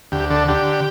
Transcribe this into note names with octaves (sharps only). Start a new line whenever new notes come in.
D2 G4
D3 A4
D3 G4